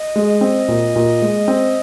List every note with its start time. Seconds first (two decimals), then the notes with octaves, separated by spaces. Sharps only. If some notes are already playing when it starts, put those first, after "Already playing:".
Already playing: D#5
0.16 G#3
0.41 C4
0.68 A#2
0.96 A#2
1.22 G#3
1.48 C4